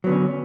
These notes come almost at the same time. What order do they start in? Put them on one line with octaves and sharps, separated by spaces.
F#3 B3 D3 C#4